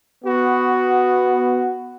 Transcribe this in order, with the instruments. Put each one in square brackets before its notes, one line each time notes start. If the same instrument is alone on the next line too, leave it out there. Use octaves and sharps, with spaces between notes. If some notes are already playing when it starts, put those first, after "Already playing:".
[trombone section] B3 F#4